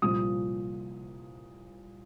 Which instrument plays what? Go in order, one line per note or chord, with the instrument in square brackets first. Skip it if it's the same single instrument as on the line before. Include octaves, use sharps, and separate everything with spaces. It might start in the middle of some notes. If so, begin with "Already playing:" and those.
[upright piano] C2 A#2 F3 D#6